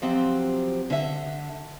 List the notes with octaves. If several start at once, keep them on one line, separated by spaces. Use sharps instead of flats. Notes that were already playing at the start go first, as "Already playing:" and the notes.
F3 F#3 C4 G4
D3 E5